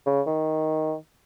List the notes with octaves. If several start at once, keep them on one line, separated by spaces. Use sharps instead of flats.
C#3
D#3